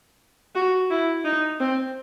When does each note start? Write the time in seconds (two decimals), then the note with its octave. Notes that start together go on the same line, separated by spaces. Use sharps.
0.55 F#4
0.91 E4
1.25 D#4
1.60 C4